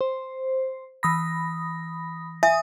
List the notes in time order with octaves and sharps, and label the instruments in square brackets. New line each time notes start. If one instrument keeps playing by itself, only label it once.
[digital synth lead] C5
[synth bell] E3 D#6 A#6 [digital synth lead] B5
[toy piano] E5 [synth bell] G#5 [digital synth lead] D#6